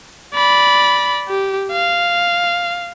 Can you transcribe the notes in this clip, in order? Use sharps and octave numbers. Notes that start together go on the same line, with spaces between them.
D5 B5
G4
F5